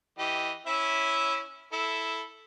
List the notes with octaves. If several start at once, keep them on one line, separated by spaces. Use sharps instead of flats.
E3 G4 D#5
C#4 E4 E5
E4 A4